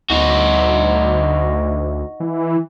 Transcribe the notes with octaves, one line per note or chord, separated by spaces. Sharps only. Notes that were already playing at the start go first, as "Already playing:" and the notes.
D2 D#4 F#4
E3